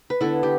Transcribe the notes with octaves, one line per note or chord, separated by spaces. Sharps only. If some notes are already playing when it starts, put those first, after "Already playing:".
B4
D3 B3 E4 A4
G4